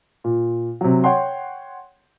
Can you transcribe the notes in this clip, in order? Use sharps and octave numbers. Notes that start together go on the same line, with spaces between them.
A#2
C3 F#3
C#5 F#5 G5 C6